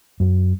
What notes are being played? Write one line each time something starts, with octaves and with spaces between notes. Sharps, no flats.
F#2